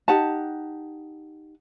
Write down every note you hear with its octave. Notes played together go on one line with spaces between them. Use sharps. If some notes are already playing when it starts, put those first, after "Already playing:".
D#4 G4 F#5 A5